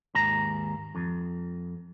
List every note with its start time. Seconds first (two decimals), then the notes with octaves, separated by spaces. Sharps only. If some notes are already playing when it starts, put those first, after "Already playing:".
0.15 D#2 G#2 A#5
0.95 F2